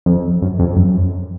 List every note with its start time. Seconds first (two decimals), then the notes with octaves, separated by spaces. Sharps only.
0.06 F2
0.42 F#2
0.59 F2
0.76 F#2